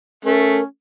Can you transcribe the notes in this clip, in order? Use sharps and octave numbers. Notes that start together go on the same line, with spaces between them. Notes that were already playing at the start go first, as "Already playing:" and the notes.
A3 C#4 A#4